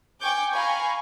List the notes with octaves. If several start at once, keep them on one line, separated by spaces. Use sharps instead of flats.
G5 G#5 C#6 D6 G6
F5 G#5 A#5 B5 C#6